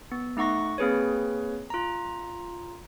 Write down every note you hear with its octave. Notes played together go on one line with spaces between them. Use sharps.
B3
A3 D#4 F#5 C#6 A#6
A#3 C4 G#4 B4 C#5
F4 A#5